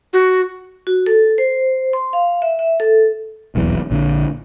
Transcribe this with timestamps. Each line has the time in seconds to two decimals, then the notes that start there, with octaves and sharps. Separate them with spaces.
0.13 F#4
0.87 F#4
1.06 A4
1.38 C5
1.93 C6
2.13 F5
2.42 E5
2.59 E5
2.80 A4
3.55 D#1 B1 E2 E3
3.91 A#1 D3